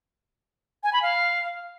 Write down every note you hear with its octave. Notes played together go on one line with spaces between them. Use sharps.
G#5
B5
F5